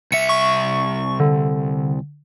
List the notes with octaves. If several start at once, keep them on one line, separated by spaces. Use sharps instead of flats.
C2 E5 C#7
C#6
D3